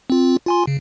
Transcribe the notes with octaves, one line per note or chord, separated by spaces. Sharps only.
C4 F4
F4 G#5 C6
C#3